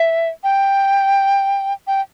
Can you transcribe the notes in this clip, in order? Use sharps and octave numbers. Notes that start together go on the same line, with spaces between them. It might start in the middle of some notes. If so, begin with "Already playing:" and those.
Already playing: E5
G5
G5